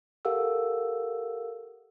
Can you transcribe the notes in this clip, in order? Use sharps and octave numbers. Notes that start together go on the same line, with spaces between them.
G4 A4 A#4 F5 F#5 E6